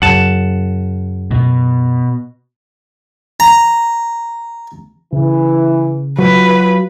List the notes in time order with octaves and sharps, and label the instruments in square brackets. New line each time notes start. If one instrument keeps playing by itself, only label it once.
[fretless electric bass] F#2 C#3 [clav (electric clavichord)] F#5 A5
[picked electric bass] B2
[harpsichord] A#5
[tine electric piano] C#3 [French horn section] E3
[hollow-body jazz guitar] F#3 [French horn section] F4 F#4 [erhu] B4